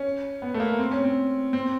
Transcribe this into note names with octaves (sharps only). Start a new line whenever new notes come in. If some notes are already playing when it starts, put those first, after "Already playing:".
Already playing: C#4
B3
A3
A#3
C4
C#4
C4
C4